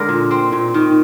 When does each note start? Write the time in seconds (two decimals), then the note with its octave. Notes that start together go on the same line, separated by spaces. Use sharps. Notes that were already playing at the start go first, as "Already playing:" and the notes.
Already playing: D3 G#3 A#4 D5
0.09 A#2
0.31 C4
0.52 A#2
0.74 D#3